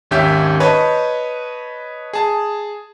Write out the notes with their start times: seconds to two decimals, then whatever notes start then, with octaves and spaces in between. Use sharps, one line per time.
0.11 G#1 D#2 C#4 G4 E5 G6
0.60 B4 C#5 D#5 A5
2.13 G#4 A5